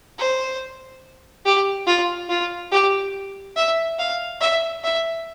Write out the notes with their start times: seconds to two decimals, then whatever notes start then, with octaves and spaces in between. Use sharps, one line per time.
0.19 C5
1.45 G4
1.87 F4
2.29 F4
2.72 G4
3.57 E5
3.99 F5
4.41 E5
4.84 E5